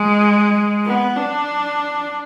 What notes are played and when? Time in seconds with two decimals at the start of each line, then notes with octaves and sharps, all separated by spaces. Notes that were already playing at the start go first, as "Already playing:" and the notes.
Already playing: G#3
0.85 B3
1.16 D4